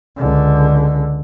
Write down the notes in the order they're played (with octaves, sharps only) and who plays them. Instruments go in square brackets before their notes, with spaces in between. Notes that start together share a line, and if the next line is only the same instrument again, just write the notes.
[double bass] C#2 D3